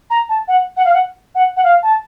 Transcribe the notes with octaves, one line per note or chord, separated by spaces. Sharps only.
A#5
A5
F#5
F#5
F5
F#5
F#5
F#5
F5
A5